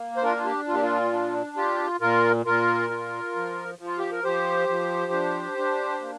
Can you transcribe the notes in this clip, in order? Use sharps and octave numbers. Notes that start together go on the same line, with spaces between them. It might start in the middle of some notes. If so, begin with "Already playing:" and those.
Already playing: A#3
C5
D4 F4 A#4
F4
G4
A#2 F4
G4
F4
D4
F4 G4
A#2 F4 A#4
A#2 F4 A#4
F4
F3
F3
F4
G4
A#4
F3 G4 C5
F3
D4
D4
A#3